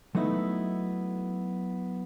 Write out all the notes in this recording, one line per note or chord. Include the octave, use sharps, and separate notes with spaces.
F#3 A3 B3 D#4 E4